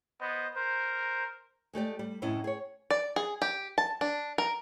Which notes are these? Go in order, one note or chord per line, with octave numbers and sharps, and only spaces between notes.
B3 C5 D#5
A#4 C5
G#3 A3 G4 D5
G3
F#2 A2 C3 C#4 E4 D#5
G#4 C#5
D5
G#4
G4
A5
D4
A#4